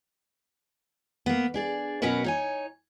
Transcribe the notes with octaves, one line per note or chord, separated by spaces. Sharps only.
A#3 B3
D4 G#4 D5
B2 F#3 C#4 F#4 A#4 B4
D#4 C#5 G#5